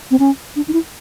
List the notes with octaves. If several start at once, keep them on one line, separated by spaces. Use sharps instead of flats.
C4
C#4
D4
D#4
E4